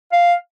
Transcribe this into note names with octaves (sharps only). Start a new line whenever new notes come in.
F5